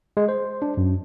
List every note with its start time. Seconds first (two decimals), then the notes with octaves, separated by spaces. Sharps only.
0.17 G#3
0.29 C5
0.62 D4
0.77 F#2